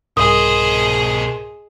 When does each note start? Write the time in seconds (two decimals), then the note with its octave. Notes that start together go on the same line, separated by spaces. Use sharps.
0.17 C2 G#2 B2 G#4 A#4 C5 D#5 D#6